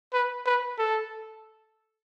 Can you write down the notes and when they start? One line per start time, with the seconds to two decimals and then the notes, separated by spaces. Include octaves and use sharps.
0.13 B4
0.46 B4
0.79 A4